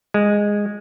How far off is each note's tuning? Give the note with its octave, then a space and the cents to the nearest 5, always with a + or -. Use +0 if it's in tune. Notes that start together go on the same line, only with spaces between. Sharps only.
G#3 -10